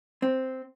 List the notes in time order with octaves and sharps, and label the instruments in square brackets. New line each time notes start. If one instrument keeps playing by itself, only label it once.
[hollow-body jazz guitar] C4